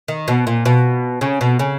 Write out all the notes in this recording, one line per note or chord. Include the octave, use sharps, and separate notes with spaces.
D#3
B2
A#2
B2
C#3
B2
C#3